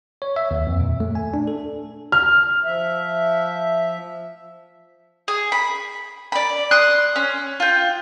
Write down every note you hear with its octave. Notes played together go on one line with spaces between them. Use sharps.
C#5
E5
D#2
F2
A#2
A3
G#5
D4
A4
F6
F3 E5
G#4
B5
D5 B5
C6 D#6 F#6
C#4
F4 G5